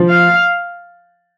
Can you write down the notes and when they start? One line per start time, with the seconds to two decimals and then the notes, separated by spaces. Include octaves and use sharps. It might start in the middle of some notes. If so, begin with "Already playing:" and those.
Already playing: F3
0.09 F5